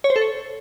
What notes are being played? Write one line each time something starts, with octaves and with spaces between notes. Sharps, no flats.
C#5
C5
A4
C#5